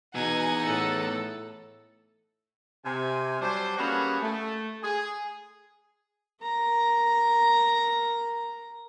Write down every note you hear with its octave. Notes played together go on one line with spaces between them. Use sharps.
E2 B2 D#4 F#5 G#5
A2 A4
C3 G#5
F#3 G3 D4 C5
G3 A#3 B3 C#4 F#4 G#4
A3
G#4
A#4 A#5